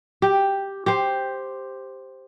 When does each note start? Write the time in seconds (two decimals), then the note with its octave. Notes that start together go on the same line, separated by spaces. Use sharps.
0.22 G4
0.86 G4 C5